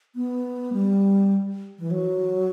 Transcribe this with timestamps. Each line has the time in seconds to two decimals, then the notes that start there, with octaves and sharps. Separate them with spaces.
0.15 B3
0.73 G3
1.79 E3
1.90 F#3